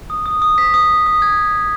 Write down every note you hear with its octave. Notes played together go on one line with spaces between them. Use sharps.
D#6
D#6
D#6
B6
D#6
D#6
D#6
G#6